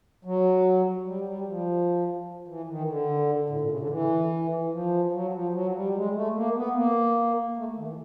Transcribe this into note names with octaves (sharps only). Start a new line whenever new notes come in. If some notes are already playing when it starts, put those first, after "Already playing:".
F#3
G3
G3
F3
E3
D#3
D3
A2
A#2
C#3
D3
E3
F3
F#3
F3
F#3
G3
G#3
A3
A#3
B3
A#3
A3
D#3
E3